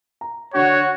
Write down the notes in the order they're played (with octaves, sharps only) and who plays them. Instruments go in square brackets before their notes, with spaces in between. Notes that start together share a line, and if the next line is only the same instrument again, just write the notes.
[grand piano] A#5
[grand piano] D3 D4 [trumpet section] F#4 [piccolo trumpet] C#5